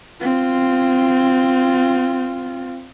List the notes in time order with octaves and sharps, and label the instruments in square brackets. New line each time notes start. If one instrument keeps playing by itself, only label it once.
[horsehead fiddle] C4 F4